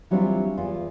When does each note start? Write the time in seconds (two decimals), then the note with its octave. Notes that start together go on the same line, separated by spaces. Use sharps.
0.11 E3 F#3 G3 C4 D4 F4
0.57 E2 F4